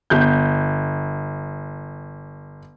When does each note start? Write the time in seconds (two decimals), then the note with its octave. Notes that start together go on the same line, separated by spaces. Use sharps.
0.10 G1 G6